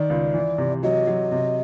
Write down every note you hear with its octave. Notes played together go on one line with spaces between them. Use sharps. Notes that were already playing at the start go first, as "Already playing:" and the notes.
Already playing: D#3 D5
C#2
E3
C3
F#3 D#5
F#3
C3